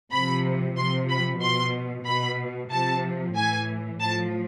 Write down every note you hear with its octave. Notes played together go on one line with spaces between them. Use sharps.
C3 F3 B5
C3 F3 C6
B5
B2 C6
B2 B5
C3 F3 A5
A2 E3 G#5
A2 F3 A5